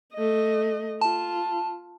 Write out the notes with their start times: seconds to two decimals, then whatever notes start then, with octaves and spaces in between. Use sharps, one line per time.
0.14 A3 D#5
1.01 F4 A5